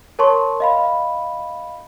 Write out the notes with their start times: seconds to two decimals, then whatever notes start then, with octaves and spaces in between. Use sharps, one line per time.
0.19 A#4 C#5 A5 C6 C#6
0.60 D#5 F5 B5